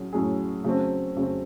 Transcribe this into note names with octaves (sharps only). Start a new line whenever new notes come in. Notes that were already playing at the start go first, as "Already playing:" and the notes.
Already playing: A2 F#3 C#4 G#4
A2 F#3 C#4 G#4
C#3 F#3 A3 C4
C#3 F#3 A3 C4